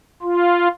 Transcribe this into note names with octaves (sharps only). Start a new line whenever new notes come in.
F4